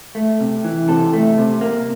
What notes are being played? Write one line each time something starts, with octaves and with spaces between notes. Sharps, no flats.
A3
C3
E3
C3 A4
A3
C3
A#3